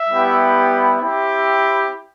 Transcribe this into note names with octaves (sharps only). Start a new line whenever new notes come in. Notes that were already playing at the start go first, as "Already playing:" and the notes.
Already playing: E5
G3 B3 E4 G4
C4 E4 G4